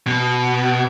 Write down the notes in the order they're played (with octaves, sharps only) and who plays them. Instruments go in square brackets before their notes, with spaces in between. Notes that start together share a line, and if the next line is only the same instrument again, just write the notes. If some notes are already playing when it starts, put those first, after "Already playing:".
[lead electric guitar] B2